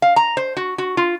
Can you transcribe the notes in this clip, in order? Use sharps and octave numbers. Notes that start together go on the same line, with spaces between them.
F5
A#5
C5
F#4
F#4
F4